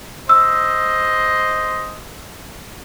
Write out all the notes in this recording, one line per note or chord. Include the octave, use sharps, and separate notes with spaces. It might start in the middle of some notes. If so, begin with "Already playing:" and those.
C5 D#5 E6